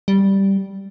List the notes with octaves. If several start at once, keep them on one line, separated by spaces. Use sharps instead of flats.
G3